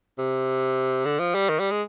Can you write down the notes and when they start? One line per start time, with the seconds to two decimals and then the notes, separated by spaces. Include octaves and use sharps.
0.18 C3
1.05 D3
1.20 F3
1.35 G3
1.49 D#3
1.60 G3
1.71 G#3